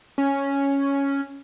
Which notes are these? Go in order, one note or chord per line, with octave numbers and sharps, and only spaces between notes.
C#4